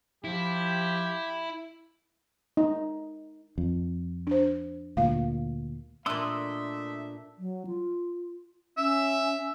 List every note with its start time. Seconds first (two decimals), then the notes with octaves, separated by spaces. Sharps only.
0.25 F3 E4 G4
2.57 D#4
3.58 F2
4.27 D4 C5
4.97 D2 A#2 F5
6.06 A#2 A3 D4 D#5 E5 C6 D#6 E6
7.38 F#3
7.67 F4
8.77 C#4 E5